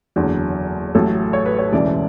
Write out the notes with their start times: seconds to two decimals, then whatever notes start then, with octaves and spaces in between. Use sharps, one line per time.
0.16 F#1 E2 D3 F#3
0.95 A1 A2 F#3 A4
1.33 C#5
1.46 B4
1.59 C#5
1.72 E1 D2 C#3 E3 D5